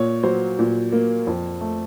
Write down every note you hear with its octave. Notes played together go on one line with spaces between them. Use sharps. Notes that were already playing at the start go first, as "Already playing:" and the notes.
Already playing: A#2 C#5
F#3 C5
A#2
A#3
F2
A3